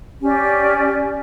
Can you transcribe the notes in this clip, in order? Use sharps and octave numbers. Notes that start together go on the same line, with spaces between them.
C#4 G4 D5